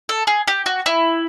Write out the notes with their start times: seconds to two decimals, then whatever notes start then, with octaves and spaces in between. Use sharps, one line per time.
0.09 A4
0.27 G#4
0.48 G4
0.66 F#4
0.86 E4